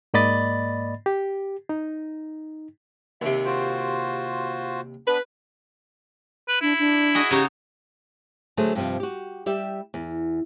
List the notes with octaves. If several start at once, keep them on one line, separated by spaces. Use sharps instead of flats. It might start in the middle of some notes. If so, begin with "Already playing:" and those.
G#2 A#3 D5 D#5 B5 A6
G4
D#4
D#2 C3 E5
F4 F#4 C5
B3 D4 B4
B4
D4 E4
D4
F#4 G#4 D#5
C#3 D#4 G4 C#5
D3 F#3 A3 G#4 C5
G2 C3 F3
F#4 G4
G3 G4 E5
E2